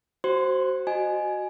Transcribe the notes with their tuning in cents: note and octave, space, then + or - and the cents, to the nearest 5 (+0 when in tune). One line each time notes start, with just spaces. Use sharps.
F#4 +30 C5 +0 C6 -25
F#4 +0 D#5 -20 G#5 +10